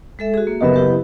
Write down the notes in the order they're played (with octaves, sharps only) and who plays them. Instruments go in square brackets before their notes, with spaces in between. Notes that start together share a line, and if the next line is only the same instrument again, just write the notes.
[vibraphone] G#3 A4 E5
F#4 G#4
A#3
[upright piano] F#1 B3 D#5 [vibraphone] G4 A#4 E5
[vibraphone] E4 G4 B4